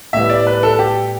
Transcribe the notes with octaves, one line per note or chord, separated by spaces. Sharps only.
A2 G3 B3 E5
D5
B4
A4
G4